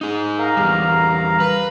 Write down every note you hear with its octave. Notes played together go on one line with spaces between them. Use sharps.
D#4 G#4
A#4 F5 A#5
E2 G3
B4